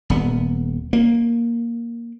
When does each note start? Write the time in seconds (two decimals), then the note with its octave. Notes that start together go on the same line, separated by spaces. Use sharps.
0.10 D#1 B3
0.93 A#3